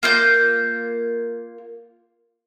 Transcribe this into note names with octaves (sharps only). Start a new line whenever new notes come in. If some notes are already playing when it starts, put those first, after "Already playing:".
A#3 F4 G6